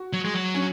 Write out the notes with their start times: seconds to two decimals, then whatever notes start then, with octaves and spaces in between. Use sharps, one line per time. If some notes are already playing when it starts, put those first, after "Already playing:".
Already playing: F#4
0.13 F#3
0.25 G#3
0.34 F#3
0.54 C#4